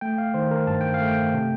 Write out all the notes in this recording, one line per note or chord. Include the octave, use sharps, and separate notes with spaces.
A3 G5
F5
D#3 C5
A#4
G2 A5
G5
F5
A3
G5
C3